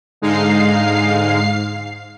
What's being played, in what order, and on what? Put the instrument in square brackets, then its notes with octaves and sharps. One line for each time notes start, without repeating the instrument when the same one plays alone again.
[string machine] G#2 F5 C7 [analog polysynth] D3 G#3 D#4